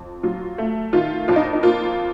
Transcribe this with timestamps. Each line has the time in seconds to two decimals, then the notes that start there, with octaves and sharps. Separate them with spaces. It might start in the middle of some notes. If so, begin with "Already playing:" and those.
Already playing: F2
0.23 F#3 F4
0.58 A3
0.93 D#3 F4
1.28 F2 F4
1.36 D#4
1.53 D#4
1.63 A#3 F4